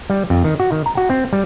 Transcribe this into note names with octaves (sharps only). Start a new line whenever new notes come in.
G3
F2
D#3
F#4
D#3
A#5
F#4
C4
G3